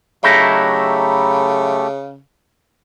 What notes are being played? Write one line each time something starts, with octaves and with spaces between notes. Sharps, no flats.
C#3 F#3 A3 D#4 E4 G4 A4